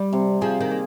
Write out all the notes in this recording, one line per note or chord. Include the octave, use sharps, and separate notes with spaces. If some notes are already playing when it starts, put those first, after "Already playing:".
Already playing: G3
C3
F3 G#4
D#3
A#3